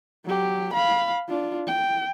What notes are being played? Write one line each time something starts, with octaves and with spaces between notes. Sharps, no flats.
F#3 G4
F5 B5
D4 F4
G5